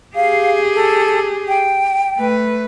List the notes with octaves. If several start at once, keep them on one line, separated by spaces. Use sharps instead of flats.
G4 G#4 F5
A4
G5
A3 B4